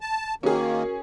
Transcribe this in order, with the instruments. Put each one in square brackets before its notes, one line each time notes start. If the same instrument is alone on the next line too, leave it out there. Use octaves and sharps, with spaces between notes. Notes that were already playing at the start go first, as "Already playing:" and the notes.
[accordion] A5
[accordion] D#3 A#3 [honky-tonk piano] C#4 G#4 [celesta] F#4 A#4 C#6